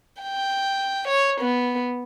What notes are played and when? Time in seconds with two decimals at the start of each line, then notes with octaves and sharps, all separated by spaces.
0.23 G5
1.08 C#5
1.41 B3